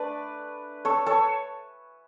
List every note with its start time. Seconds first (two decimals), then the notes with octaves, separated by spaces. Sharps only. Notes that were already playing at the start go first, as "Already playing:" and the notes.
Already playing: A3 D4 B4 D5
0.85 A4 C#5
1.06 A4 C#5